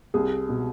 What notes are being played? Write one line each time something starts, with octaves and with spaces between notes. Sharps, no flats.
C2 G#4
B2